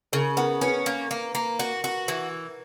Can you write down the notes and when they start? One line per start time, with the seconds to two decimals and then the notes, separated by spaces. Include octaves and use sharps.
0.13 C#3 A#4
0.37 B3 A#4
0.61 C#4 B4
0.86 A#3
1.11 A#3
1.35 A#3
1.59 F#4
1.84 F#4
2.08 E3